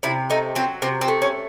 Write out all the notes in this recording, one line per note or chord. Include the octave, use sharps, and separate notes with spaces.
C3 E4
A3 D#4
F#3 C4
C3 C4
C4
A3
C#4